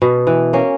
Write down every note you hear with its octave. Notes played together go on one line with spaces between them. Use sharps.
B2
E3
A#3 C#4